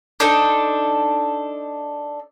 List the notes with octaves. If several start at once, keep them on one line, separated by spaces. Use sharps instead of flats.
D4 D#4 A4 C5